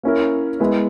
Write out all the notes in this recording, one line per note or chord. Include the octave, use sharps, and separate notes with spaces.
A#3 C#4 E4 A#4
G#3 B3 E4 B4